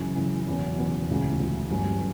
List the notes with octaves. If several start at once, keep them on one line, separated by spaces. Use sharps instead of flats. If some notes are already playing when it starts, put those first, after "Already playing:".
Already playing: F#2 C#3 E3
F#2 C#3 E3
F#1 E2 B2
F#1 E2 B2
D2 C#3 E3
D2 C#3 E3
G1 G2 F#3 C#4 F#4